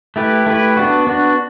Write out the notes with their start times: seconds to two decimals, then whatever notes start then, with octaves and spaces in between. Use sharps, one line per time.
0.16 A3 E4 G4 B4
0.46 A3 E4 G4 B4
0.77 B3 D4 F#4
1.07 B3 D4 F#4